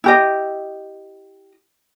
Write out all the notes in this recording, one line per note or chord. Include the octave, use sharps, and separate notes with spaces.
E4 G4 D#5